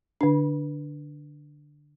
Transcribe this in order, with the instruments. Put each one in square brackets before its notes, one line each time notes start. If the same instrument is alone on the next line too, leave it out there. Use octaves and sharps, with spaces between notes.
[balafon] D3 D4